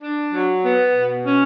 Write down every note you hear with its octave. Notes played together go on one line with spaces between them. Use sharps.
D4
F#3
B3
B2
C#4